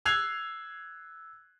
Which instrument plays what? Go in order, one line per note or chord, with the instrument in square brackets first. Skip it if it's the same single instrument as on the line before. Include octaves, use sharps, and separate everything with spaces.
[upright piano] E6 F#6 G#6 C7 F7